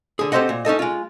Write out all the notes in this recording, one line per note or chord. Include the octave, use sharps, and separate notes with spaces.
D3 G#4
C4 G4 A4 C5 D#5 F#5
A#2
C#4 D#4 A4 D#5
G#3 F4